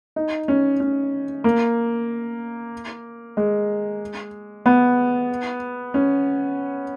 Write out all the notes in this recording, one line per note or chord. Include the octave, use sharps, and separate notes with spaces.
D#4
C#4
C#4
A#3
G#3
B3
C#4